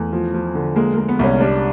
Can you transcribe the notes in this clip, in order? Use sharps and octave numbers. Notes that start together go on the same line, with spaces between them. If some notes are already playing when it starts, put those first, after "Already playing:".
Already playing: E2 A3
F3
F3
D3
G#3 A#3
G#3 A#3
B3
C2 C#4
G3 D4